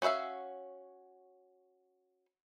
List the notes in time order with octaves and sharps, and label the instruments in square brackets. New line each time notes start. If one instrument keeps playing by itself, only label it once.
[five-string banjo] C#4 F#4 B4 E5 F5